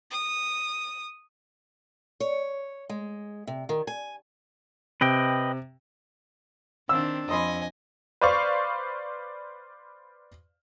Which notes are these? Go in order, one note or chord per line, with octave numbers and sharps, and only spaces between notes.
D#6
C#5
G#3
C3
D#3
G#5
C3 B4 D#5 G5
D#3 C4 D4 E6
F2 D#5 G#5 B5 C6 D#6
B4 C5 D5 F5 C#6